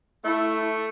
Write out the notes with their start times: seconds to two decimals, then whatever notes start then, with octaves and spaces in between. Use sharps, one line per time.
0.24 A3 E4